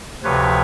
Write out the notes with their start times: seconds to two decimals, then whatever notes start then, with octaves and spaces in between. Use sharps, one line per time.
0.23 D2 C3 F3 B4 C#5